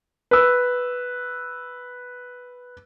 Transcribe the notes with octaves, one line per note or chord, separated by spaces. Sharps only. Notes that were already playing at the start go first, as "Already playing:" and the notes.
B4 E6